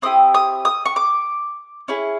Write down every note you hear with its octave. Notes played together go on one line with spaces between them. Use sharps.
C4 E4 G4 D#6
D#6
D#6
C#6
D6
C#4 E4 G#4